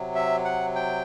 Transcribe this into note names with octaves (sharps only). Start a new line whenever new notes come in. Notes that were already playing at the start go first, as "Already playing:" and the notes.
Already playing: C3 F#3
E5
F#5
G5